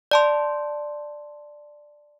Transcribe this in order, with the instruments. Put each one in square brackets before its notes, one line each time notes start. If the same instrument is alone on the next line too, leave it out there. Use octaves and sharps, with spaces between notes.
[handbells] D5 A5 C6